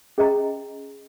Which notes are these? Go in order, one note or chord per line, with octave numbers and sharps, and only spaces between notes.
C#4 G#4 D#5 G5 A#5